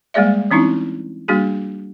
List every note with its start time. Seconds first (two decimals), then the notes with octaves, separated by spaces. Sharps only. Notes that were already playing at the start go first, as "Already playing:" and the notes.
0.14 G3 G#3 A#3 G#4 D5 E5
0.51 E3 C4 C#4 D#4 E4
1.28 G3 A#3 D4 F#4 G#4